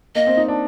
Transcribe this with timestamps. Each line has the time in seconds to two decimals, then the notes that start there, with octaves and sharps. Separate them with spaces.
0.15 A#3 D#5
0.27 C4
0.37 D#4
0.48 D4